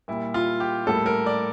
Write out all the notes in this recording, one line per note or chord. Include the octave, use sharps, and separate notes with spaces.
A#2 G3 A#3 E4
F4
G4
A2 G3 A#3 A4
A#4
D5